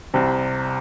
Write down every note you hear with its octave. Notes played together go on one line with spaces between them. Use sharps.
C2 C3 G3